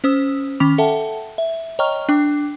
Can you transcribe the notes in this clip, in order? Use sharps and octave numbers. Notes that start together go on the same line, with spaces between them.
C#4 C5 D#6 E6
D#3 C#4 B5 D6 F7
A4 E5 F#5 G5 A5
E5
C#5 D#5 G5 A#5 C#6 F6
D4 G5 D6